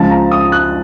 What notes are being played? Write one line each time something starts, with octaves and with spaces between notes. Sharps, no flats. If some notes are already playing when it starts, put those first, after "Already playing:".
Already playing: C#2 C#3 F3 A5
A#5
D#6
F#6